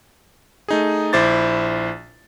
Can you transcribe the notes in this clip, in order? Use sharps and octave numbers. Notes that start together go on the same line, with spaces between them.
A3 D#4 G#4
A#1 E4 C5 D6 A6